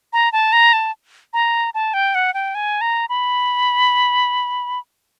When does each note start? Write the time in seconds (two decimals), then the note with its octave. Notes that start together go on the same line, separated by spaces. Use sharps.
0.13 A#5
0.32 A5
0.53 A#5
0.73 A5
1.33 A#5
1.74 A5
1.94 G5
2.15 F#5
2.34 G5
2.55 G#5
2.81 A#5
3.09 B5